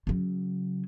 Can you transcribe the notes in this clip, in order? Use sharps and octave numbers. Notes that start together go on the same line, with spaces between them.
C#3 F#3